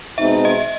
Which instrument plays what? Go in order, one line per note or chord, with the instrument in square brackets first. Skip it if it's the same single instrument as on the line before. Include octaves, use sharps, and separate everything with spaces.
[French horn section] B2 G#3 C4 D#4 [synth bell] E5
[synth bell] D#5